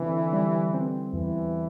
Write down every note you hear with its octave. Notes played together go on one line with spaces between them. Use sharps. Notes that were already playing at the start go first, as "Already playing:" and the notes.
Already playing: D3 E3 C4
G3
C4
E2 E3